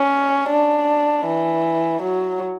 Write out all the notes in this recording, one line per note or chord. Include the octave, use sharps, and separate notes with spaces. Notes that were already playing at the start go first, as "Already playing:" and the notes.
Already playing: C#4
D4
E3
F#3